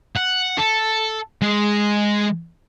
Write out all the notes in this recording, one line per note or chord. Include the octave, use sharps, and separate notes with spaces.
F#5
A4
G#3